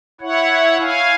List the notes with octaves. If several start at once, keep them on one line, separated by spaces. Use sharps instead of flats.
E4 C#5 F#5
F5 G#5